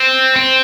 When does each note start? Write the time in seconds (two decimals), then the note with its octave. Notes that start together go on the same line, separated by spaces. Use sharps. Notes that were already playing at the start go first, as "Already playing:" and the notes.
Already playing: C4
0.36 C4